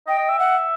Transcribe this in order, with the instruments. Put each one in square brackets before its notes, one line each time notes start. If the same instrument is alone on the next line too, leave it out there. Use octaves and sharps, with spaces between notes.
[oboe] D#5 [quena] G5
[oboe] D#5
E5
[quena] F#5